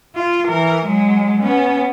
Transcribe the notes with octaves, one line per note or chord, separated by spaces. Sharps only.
F4
E3 A#4
F#3 G#3
B3 C#4